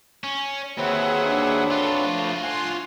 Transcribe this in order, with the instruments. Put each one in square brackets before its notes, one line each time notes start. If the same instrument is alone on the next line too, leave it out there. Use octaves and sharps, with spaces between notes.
[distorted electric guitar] C#4
[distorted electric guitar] D#2 [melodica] F#3 C4 B4 [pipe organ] G#4 E5 F#5
[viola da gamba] D4
[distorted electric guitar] F4 F#4 [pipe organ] A4
[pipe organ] F3 A3
[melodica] F#5 G#5 [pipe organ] C6